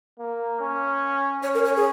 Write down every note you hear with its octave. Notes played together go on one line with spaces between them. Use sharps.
A#3
C#4
C#4 C#5
A#4
C#5
G#4